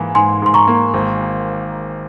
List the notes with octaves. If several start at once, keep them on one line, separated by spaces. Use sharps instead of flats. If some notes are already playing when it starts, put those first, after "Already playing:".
Already playing: G#2 E3 A#3
G#2 G#5 C6
G#2 C6
A#5 C#6
A#3
G#1